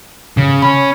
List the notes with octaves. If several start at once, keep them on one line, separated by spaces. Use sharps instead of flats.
C#3
C#4 B5